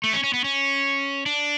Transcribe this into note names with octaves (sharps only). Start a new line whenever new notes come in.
A3
C#4
C#4
B3
C#4
D4